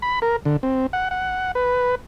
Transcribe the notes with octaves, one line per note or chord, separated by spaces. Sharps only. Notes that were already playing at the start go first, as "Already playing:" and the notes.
B5
A#4
D3
C4
F#5
F#5
B4